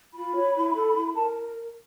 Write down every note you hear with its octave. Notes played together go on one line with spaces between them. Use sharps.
F4 B5
C#5
E4
A4
E4
A#4 A5